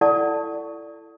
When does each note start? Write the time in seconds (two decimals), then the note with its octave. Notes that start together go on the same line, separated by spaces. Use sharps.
0.01 E4 A4 D5 F#5 A5 C#6